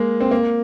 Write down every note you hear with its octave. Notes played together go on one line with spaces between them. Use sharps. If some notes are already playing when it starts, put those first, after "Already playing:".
Already playing: G#3 A#3
C4
A#3